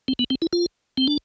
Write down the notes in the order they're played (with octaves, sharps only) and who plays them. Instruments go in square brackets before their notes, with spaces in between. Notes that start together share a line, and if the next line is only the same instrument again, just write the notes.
[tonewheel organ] C4
B3
C4
E4
F4
C4
D4